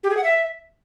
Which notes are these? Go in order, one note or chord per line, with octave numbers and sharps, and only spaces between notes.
G4
G#4
F#5
E5